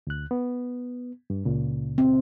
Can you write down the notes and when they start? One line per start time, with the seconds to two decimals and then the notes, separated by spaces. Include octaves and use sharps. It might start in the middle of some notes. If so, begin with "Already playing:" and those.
0.07 D2 F#6
0.31 B3
1.30 G2
1.45 C#2 A#2 C#3
1.98 C4